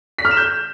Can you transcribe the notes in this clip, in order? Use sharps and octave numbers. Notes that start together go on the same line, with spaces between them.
B6
F6
E7
G6